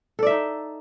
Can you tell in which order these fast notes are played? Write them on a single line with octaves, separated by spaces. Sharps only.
A4 D5 E5 D#4